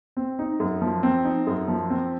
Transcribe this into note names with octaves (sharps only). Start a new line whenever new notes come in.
C4
D#4
F#2
F3
C4
D#4
F#2
F3
C4